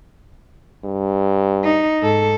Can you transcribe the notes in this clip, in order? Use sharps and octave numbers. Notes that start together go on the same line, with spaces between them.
G2
D#4
G#2 A4